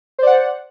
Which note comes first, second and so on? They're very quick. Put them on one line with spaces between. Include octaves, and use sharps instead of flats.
C5 D5 F#5